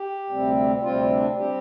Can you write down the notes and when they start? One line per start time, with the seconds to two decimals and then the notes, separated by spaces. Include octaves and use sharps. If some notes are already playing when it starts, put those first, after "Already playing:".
Already playing: G4
0.29 D2 C3 G3 C4
0.82 D2 C3 G3 C4 F4
1.10 D4
1.36 G3 C4 G4